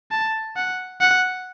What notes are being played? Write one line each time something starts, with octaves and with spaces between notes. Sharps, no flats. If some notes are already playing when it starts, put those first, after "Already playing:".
A5
F#5
F#5